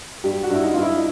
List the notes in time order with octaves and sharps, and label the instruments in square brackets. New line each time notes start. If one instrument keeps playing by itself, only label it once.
[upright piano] G2 G4
F#4
G2 E4
D#4
G2 F4
E4
D#4